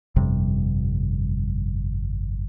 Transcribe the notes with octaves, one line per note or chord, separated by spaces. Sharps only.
G1 F2 C3 G3